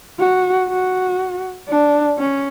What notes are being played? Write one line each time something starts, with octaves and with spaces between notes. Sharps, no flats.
F#4
F#4
D4
C#4